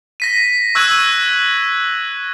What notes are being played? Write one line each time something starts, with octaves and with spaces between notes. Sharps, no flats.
A#6 B6 D#7
C#6 E6 F#6 G#6 D#7 F#7